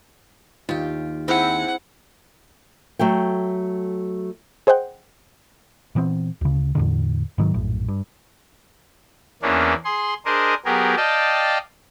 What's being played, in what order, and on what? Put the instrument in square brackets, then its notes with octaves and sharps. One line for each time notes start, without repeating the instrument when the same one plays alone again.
[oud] D#2 [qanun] F4 G4
[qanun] C4 E4 G#4 [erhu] F#5
[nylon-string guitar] F#3 A3 A4 G5
[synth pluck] G#4 C5 D#5 F#5 G5
[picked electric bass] A#2 E3 B3 C4
D2 C#3
E2 A2 D3
G#2 D#3 F#3
A#1 F#2 A2
G2
[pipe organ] E2 E3 A#3 C#4 D4
G#4 C6
D4 G#4 A#4 C5 D#5
F#3 B3 G4 G#4 A#4
D5 D#5 F5 G5 A5